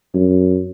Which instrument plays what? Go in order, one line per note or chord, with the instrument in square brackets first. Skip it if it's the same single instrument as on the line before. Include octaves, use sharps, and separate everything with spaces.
[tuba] F#2